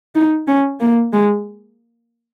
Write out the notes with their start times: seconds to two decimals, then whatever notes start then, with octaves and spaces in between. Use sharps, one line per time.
0.15 D#4
0.47 C#4
0.80 A#3
1.13 G#3